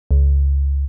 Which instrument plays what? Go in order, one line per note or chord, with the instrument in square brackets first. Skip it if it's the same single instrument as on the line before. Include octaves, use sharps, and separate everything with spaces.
[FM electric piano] C#2